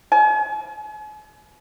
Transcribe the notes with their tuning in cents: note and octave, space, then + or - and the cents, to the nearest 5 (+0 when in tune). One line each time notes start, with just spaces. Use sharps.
G#5 +40